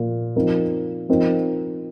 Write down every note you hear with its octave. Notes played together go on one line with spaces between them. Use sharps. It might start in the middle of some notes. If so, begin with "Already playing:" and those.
Already playing: A#2 F3 A#3
F3 C4 D#4 A#4
F3 C4 D#4 A#4